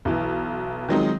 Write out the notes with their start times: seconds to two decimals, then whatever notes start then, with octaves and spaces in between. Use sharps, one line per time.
0.05 B1 E3
0.88 D#3 F3 F#3 G#3 C4 D#4